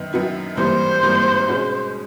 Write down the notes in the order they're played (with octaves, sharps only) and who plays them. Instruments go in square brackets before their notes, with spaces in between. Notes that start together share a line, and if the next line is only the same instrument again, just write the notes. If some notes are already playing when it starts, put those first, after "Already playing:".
Already playing: [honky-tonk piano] F#2 D#3 B3
F#2 D#3 F#3 B3 E4
[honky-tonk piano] G#1 G2 E3 G3 A#3 [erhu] C5
[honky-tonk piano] G#1 G2 E3 G3 A#3
B2 G#3 C#4 F#4